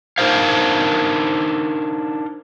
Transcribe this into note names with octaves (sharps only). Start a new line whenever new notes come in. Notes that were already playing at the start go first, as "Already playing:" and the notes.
D4 D#4 A#4 C5 F5